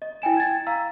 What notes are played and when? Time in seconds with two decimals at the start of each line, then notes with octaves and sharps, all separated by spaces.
0.02 D#5
0.22 E4 G5 G#5 E7
0.37 G#6 A6
0.66 F5 A#5 E6